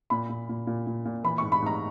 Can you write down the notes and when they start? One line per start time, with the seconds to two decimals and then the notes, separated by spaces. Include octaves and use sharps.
0.10 A#2 B5
0.29 A#2
0.49 A#2
0.67 A#2
0.87 A#2
1.05 A#2
1.23 E3 B5
1.38 G#2 C#6
1.52 B5
1.62 G#2 A#5